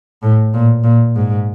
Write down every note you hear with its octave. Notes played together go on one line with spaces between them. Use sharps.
A2
A#2
A#2
G#2